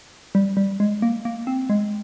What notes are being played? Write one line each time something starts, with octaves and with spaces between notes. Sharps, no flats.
G3
G3
G#3
A#3
A#3
C4
G#3